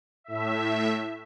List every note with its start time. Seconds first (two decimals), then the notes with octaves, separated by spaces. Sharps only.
0.24 A2 E5